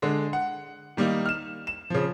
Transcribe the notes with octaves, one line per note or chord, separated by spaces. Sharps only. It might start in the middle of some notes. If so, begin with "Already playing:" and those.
D3 G#3
F#5
D#3 G3 A#3 D#4
F6 E7
E7
C#3 F3